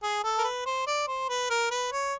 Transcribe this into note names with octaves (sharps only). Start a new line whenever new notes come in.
G#4
A4
A#4
B4
C5
D5
C5
B4
A#4
B4
C#5